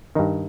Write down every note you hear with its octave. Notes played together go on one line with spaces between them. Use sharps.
G2 D#3 D#4